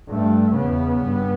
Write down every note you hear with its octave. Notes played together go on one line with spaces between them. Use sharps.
G2 A3
E2 C#3 B3
G2